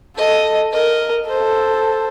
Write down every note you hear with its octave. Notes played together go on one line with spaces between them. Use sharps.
A4 D#5
A#4 D#5
A4 C5